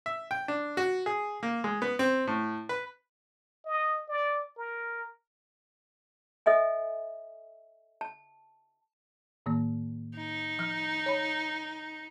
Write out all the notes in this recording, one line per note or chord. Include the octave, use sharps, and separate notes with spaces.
E5
G5
D4
F#4
G#4
A#3
G#3
B3
C4
A2
B4
D#5
D5
A#4
A4 D#5 E5 G#5
A5
A2 D#3 A#3
D#4
F3 F6
C#5 B5